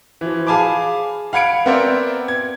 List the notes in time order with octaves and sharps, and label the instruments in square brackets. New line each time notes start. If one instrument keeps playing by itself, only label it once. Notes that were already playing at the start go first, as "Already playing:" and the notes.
[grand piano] E3 F3
G#4 F5 G#5 A5 B5 D6
F5 F#5 B5 G#6 C#7 D7
B3 C4 A#4 C5 D5 E5
G#6